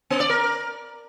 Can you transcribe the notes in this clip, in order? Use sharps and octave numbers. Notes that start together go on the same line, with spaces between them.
B3
D5
A#4